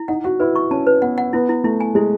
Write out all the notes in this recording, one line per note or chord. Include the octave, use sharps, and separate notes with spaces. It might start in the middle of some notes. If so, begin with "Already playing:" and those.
Already playing: E4
D#4 F#5
F#4 F#5
E4 B4
C#6
C#4 A5
B4
B3 F#5
F#5
B3 E4
E4
A3 E4
G#5
G#3 E4